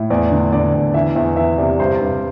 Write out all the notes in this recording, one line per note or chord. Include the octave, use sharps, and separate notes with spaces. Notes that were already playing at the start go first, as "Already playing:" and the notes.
Already playing: A2
E2 D5
D3
D3 D5
E2
E3 E5
E2 E5
E3 E5
C3 D5
G2 C5
G2